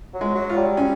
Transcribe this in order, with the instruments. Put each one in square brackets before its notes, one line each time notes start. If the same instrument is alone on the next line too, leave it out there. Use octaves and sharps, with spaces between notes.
[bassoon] F#3
[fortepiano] G#3
[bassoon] F#3
[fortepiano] F4
[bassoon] G3
[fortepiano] C#4